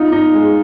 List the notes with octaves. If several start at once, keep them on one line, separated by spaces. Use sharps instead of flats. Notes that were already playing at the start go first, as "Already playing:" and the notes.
Already playing: D#4 F4
D#4
G#3